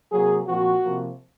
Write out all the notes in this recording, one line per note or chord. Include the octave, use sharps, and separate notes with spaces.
C3 F#3 A#3 G#4
A#2 F3 C4 F#4
C3 F3 A#3